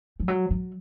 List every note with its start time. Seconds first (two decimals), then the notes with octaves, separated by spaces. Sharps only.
0.20 F3
0.28 F#3
0.51 F#3